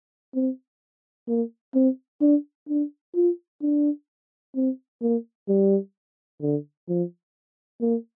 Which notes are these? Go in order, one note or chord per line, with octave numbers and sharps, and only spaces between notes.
C4
A#3
C4
D4
D4
F4
D4
C4
A#3
G3
D3
F3
A#3